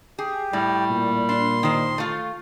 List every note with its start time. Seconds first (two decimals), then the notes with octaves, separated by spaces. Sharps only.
0.19 G4 G#4
0.53 A2 G3
0.91 A#2
1.29 D4 C6
1.63 D#3 C5
1.98 A3 F4